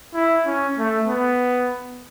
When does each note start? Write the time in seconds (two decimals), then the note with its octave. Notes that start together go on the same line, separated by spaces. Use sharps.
0.14 E4
0.46 C#4
0.77 A3
1.07 B3